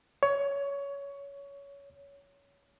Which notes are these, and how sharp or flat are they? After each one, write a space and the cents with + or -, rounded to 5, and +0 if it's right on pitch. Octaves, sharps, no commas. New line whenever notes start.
C#5 +20